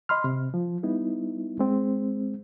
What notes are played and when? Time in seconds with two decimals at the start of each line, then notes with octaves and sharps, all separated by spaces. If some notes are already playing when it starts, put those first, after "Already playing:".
0.09 D#5 B5 C6 F6
0.24 C3
0.54 F3
0.83 G3 B3 D#4 E4
1.59 G#3 C4